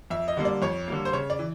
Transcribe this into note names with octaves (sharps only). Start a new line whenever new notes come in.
F2 E5
D#5
D3 G3 A#3
D5
F2 C#5
D3 G3 A#3
C5
C#3 C#5
D5
E3